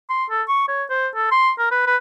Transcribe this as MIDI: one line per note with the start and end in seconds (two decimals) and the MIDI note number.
0.10 0.25 84
0.30 0.42 69
0.48 0.65 85
0.68 0.84 73
0.90 1.07 72
1.16 1.29 69
1.31 1.51 84
1.59 1.67 70
1.71 1.86 71
1.87 1.97 71